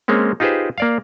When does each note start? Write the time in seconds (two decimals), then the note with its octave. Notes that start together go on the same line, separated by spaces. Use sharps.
0.08 G#3 A#3 C4 C#4
0.40 D#4 F4 G4 G#4 B4 C5
0.78 A#3 D5 F5